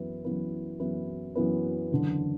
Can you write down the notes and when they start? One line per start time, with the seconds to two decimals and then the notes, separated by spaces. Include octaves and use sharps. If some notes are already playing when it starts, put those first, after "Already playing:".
Already playing: F#2 E3 B3 E4 B4
0.25 F#2 E3 B3 E4 B4
0.80 F#2 E3 B3 E4 B4
1.35 F#2 E3 B3 E4 B4
1.91 F#1 E2 D3